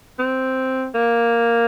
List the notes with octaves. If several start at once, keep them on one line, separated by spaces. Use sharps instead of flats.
C4
A#3